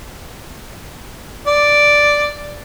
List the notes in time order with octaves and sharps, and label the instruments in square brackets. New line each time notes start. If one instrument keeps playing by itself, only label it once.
[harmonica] D5